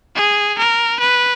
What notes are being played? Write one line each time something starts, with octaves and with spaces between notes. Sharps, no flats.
G#4
A#4
B4